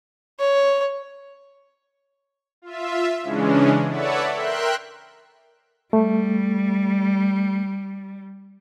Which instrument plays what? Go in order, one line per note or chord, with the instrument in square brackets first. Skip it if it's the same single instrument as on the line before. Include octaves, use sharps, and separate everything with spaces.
[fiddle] C#5
[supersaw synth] F4 E5
C#3 E3 G#3 C#4 D4
A4 B4 C#5 D5 E5 F#5
A#4 E5 G5 C6 F#6
[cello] G3 [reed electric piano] A3